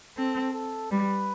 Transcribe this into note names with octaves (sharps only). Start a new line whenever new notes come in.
C4 A4
A4
G3 B4